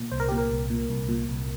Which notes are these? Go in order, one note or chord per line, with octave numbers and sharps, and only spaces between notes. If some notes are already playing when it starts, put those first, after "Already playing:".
Already playing: A#2
C2 C5
A#4
A#2 G4
A#4
C2
A#2
C2
A#2
C2